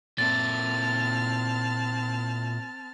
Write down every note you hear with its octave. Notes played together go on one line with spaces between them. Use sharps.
A#2 C4 E4 A5 F6 A6